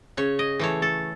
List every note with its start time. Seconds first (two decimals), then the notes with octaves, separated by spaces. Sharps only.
0.17 C#3 C#5
0.39 D#5
0.60 E3 A3 C#5
0.82 A4